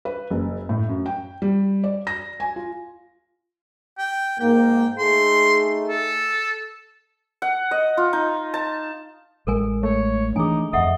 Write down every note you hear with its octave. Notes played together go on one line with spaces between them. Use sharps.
B4
F#1
A2
F#2
G5
G3
D5
A#6
G#5
F4
G5
G#2 A#3 G5
A3 D#4 G#4 C6
A4
F#5
D#5
F4
D#4
A5
A1 G#3 A4 A#4 G#5
A3 C#5
D#3 E3 D4 D#4 G#4 G#5
D1 F2 A4 D#5 E5 F#5